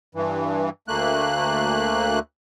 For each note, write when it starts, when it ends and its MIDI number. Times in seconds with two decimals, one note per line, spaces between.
0.15 0.70 43
0.15 0.70 52
0.88 2.19 38
0.88 2.19 57
0.88 2.19 58
0.88 2.19 90